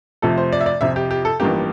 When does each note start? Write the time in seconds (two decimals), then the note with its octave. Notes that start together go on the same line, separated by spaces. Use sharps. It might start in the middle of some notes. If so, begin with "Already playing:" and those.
0.22 F2 C3 F3 A3 A4
0.38 C5
0.53 D5
0.61 E5
0.66 D5
0.81 F2 C3 F3 E5
0.96 G4
1.11 G4
1.25 A4
1.40 A1 G2 F3 A#3 G4